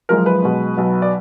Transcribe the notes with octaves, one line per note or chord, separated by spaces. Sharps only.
F#1 F#2 F3 G#3 A#4
B4
B1 B2 G#3
B1 B2 F#3
D5